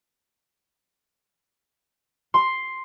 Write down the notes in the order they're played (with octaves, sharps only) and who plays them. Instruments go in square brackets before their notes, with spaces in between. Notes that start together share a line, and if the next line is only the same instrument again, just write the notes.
[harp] C6